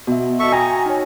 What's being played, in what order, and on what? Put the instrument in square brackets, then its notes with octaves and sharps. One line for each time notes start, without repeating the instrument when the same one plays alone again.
[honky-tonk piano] B2 [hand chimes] F#4 E5
[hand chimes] F#4 D#5 [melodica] A4 E5 C#6
[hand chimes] F#4 G5 D#6 [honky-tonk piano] G#5 [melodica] A#5
[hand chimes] D#4 C#5